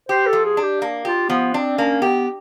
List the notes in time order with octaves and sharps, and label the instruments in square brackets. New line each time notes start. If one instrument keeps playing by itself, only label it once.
[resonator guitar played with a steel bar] G4 [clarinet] C5
[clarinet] A4
[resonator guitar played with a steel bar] F3
[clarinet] G#4
[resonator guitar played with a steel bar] D4
[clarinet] G4
[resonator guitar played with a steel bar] A#3
[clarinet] F4 [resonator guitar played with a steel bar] G4
[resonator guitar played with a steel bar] F3 [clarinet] B3
[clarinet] C4 [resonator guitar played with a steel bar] D4
[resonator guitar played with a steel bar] A#3 [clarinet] C#4
[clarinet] B3 [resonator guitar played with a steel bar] G4